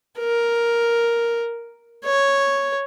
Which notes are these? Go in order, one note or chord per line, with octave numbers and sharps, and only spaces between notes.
A#4
C#5